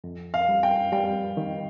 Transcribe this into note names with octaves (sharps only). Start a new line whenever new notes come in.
F2
F5
G3
G5
G3 G5
D#3